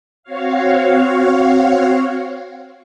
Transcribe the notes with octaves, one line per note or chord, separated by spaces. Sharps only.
C4 F#4 C#5 F5